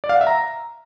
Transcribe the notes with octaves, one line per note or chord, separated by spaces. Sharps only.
D5
F5
F#5
E5
A#5